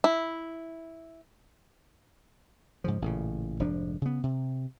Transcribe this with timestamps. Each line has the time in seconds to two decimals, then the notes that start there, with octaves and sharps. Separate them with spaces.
0.04 E4
2.84 G#2 C#3 F3
3.02 A1 A#2 C#3
3.59 F1 G#2 F3 D4
4.02 C#3 B3
4.23 C3